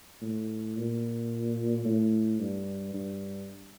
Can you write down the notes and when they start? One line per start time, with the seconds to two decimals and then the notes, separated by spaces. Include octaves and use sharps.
0.21 A2
0.76 A#2
1.85 A2
2.39 G2
2.94 G2